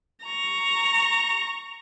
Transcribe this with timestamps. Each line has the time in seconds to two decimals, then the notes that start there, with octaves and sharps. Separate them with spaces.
0.25 A#5 C#6